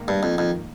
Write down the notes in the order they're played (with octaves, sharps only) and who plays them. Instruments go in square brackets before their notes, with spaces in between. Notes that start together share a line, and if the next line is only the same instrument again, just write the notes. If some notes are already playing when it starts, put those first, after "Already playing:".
Already playing: [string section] G#2 D#3 A#3
[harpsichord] G2
F2
F2